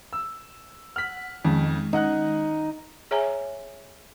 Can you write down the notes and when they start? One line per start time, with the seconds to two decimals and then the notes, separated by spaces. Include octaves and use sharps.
0.13 E6
0.96 F#5 F6 B6
1.45 F2 D#3 G#3 C#4
1.93 D#4 D#5 F#5 F#6
3.11 G#4 C#5 E5 G#5 A#5